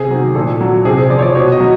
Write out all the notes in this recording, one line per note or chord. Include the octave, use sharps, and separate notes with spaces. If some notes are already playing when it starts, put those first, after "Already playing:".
Already playing: C3 G#4
D#3 F#3
A#2 A4
F#3
C3 G#4
G#4
F3 D5
C#5
D5
B2 C#5
D#5
F#3